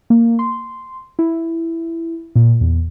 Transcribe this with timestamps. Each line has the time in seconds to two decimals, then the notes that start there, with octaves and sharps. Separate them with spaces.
0.10 A#3
0.39 C6
1.19 E4
2.35 A#2
2.61 E2